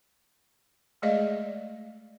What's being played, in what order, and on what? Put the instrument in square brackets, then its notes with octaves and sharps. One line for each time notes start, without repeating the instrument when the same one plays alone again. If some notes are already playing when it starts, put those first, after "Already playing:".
[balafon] G#3 A3 G#4 D5 D#5 F5